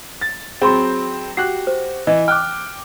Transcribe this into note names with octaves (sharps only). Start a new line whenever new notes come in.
A6
F#3 C4 G#4 B5 C6
F#4 G4 F#6 C7
C5
E3 D#5
G5 D6 F6 F#6